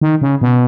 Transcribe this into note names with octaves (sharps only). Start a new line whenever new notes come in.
D#3
C#3
B2